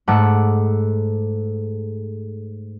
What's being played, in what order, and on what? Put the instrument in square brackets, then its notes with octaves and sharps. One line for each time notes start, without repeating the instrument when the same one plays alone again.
[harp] G#2 A3 A4 F#5 D6